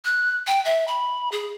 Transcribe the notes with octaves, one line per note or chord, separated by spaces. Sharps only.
F#6
G5
E5
B5
G#4